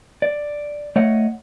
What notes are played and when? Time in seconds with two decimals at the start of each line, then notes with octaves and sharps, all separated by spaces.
0.22 D5
0.96 A3 C#5 D#5 F#5